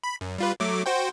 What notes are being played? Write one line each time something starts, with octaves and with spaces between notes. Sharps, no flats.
B5
F#2
G3 F4 B4
F#3 A3 D6
F#4 C5 G5